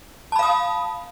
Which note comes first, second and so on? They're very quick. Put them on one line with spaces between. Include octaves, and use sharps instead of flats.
A5 B5 F5 D#6